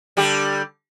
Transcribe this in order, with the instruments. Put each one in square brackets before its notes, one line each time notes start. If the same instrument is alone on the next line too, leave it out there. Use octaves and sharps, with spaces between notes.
[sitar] D3 G3 G4